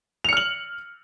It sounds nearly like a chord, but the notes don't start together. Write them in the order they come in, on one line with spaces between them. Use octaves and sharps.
F7 C#7 F6 F#7